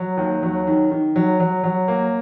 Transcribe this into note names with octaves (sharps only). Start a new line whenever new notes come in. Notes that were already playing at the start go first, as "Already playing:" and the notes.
Already playing: F#3
D#2
F#3
D#3
D#3
F#3
F#3
F#3
A#3